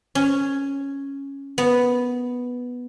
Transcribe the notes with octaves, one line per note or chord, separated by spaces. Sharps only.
C#4
B3